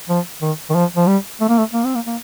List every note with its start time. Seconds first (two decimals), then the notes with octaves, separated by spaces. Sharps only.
0.09 F3
0.42 D#3
0.70 D#3
0.75 F3
0.96 F3
1.07 G3
1.41 A3
1.49 A#3
1.59 A3
1.73 A#3
1.85 C4
1.95 A#3
2.07 A#3